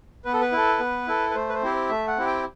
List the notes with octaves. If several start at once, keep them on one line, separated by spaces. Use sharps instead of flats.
B3 B4
A4
B4
E4 A4
B3
E4 A4
B4
A3 C5
B4
C5
C4 E4 G4
A3 E5
F#5
C4 E4 G4
G5